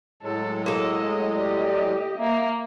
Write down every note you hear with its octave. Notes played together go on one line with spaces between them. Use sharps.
A2 F#3 G#3 A4
A#3 A4 D#5
G4 D5 D#5
A#3 E5